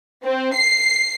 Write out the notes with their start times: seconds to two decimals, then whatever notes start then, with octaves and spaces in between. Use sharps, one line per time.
0.23 C4
0.54 C7